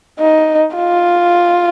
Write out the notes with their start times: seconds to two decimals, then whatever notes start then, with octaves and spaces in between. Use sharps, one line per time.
0.19 D#4
0.75 F4